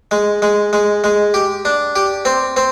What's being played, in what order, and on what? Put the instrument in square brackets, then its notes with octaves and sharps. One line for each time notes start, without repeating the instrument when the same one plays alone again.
[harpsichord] G#3
G#3
G#3
G#3
G4
D4
G4
C4
C4